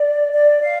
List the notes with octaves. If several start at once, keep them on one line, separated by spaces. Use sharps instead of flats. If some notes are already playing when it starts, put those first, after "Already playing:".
Already playing: D5
D5
F5